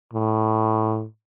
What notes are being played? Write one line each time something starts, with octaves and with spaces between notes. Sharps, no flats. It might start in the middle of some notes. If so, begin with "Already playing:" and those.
A2